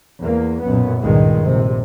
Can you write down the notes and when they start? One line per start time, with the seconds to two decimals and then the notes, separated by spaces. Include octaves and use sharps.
0.21 E2 A#3
0.63 B1 F#2 A#2 B3
0.99 C#2 G2 A#2 D#3 G#3
1.42 A#1 C3